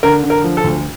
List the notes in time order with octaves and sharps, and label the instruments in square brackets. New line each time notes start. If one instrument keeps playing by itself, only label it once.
[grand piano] D3 A#4
D3
A#4
F3
A4
D2